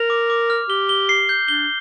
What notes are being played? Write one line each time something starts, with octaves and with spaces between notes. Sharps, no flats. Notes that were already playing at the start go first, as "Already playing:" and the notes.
Already playing: A#4 F7
D6
D6
F6
G4 G7
G7
C7
G6
D4 G7